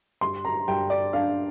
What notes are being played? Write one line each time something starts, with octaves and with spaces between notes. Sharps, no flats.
G2 C6
A#5
G2 G5
D5
D4 F5